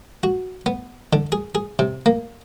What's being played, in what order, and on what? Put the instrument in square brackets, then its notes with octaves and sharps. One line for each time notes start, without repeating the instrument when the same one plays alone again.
[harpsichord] F#4
B3
D3
G#4
G#4
C3
A#3